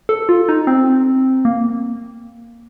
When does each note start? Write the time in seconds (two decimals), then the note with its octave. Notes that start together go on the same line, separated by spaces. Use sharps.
0.09 A4
0.29 F4
0.49 D#4
0.67 C4
1.45 A#3